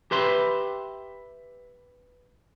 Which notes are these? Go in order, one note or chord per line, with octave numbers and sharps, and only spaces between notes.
G4 B4 E5 C6